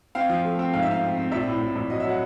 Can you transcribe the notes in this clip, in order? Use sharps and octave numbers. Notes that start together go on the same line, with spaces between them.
C4 F5
F3
A3
C4
G#2 F5
E5
C4 F5
C4
C4
A#1 E5
A2
A2
A#1
F#3 D#5
E5
F#3 F#5